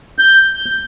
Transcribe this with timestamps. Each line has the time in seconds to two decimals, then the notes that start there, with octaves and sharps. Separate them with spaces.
0.19 G6